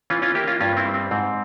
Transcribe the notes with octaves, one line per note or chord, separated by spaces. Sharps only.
E3 C#4 F4
C#4 F4
A#3 E4 G4
C#4 F4
G2 C#4 F4
C4 E4
G3
C4
G#2 C4